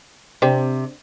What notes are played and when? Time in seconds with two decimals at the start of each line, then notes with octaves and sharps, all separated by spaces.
0.42 C3 D4 G4 C5